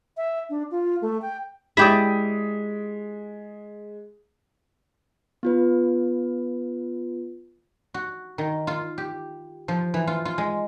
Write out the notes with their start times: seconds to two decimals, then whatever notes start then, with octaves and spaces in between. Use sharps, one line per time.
0.17 E5
0.50 D4
0.71 F4
1.02 A3
1.22 G5
1.77 G#3 E4 G4 D5 D#6 B6
5.43 B3 F4 B4
7.94 F#4
8.38 D#3
8.67 F4
8.98 G4
9.68 F3
9.94 E3
10.07 F4
10.25 F4
10.38 G#3